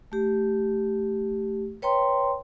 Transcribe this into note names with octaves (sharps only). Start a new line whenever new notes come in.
A3 G4
B4 C#5 G5 A#5 C6